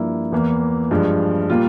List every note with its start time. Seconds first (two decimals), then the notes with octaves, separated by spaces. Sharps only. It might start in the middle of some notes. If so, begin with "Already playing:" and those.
Already playing: G2 F3 A#3 E4
0.32 E2 E3 A#3
0.91 G2 F3 G#3
1.50 A#2 G3 A#3 F4